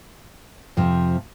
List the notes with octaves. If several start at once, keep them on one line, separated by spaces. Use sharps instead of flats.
F2 C3 F3